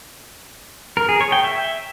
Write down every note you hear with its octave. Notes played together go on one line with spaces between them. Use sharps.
A#4
G#4
C#5
G5
E5